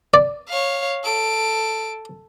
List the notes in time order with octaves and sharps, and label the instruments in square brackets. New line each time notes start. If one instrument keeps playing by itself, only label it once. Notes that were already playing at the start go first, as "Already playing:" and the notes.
[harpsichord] D5
[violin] C#5 F5
A4 D7